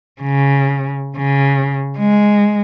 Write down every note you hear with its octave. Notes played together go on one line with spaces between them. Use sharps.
C#3
C#3
G#3